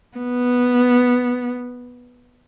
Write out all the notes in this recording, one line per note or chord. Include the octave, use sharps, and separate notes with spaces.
B3